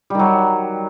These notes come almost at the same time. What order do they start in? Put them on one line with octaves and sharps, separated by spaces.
G3 D#3 F#3